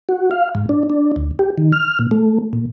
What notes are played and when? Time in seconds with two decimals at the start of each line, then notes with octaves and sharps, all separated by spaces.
0.09 F#4
0.31 F5
0.55 G#2
0.69 D4
0.90 D4
1.16 D2
1.39 G4
1.58 D#3
1.72 F6
1.99 A#2
2.11 A3
2.53 A#2